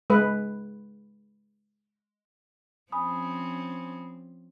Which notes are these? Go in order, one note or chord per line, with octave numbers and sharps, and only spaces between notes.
G#3 B4
F3 C4 C#4 G#5 B5 D#6